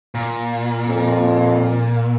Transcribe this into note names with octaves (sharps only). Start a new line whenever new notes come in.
A#2
F2